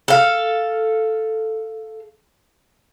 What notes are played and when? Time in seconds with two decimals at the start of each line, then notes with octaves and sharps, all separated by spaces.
0.08 A4 F5